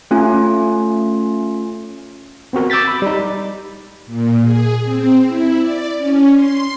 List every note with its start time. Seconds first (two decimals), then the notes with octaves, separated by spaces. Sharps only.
0.11 A3 C#4 F4 G#5
2.53 B3 C4 F#4 A#4
2.70 D6 E6 G6 A6 B6
2.88 B5
3.02 G3 D#4
4.06 A#2
4.42 G#4
4.84 C4
5.26 E4
5.59 D5
5.98 C#4
6.33 C6